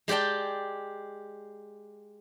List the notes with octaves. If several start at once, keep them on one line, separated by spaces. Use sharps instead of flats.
G#3 G4 D5 G5 A5